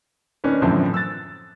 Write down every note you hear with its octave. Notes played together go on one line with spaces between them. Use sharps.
D#3 C#4 D4 B4
F#2 A2 D3 E3 F3 C4
E6 F#6 A6